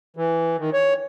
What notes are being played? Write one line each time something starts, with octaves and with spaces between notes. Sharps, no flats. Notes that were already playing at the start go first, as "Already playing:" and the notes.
E3
D#3
C#5